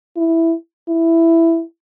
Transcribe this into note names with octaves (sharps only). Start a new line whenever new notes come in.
E4
E4